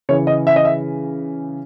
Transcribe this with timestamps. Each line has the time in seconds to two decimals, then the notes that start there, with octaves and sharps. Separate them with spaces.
0.09 C#3 E3 C#5
0.27 D#5
0.47 E5
0.56 D#5
0.65 E5